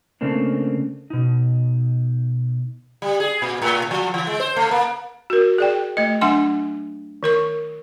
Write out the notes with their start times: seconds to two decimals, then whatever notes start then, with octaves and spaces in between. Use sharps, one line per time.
0.21 C#3 A3 A#3 C4 D4
1.10 B2 D#4
3.02 G3
3.20 G#4
3.42 A#2
3.62 A2
3.91 F3
4.14 E3
4.27 G#3
4.40 C5
4.56 A3
4.71 A#3
5.30 F#4 A#4
5.58 G#4 D5 G5
5.97 A3 D#5
6.21 F#3 D4 F#5 G#5 C6
7.23 D#3 A#4 C#6